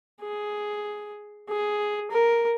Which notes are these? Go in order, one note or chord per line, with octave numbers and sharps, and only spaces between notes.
G#4
G#4
A#4